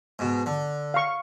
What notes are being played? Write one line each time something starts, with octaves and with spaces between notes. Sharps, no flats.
G#2 B2
D3
F5 C#6